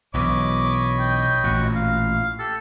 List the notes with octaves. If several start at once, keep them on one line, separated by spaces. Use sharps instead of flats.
B1 B2 E3 C#5 D#5 B5 D6
G5
A1 A#2 F#4
F5
G4 A4